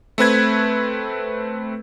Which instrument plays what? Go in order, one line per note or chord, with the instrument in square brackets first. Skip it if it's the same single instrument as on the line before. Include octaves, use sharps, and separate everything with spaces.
[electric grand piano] A3 C4 B4 G#6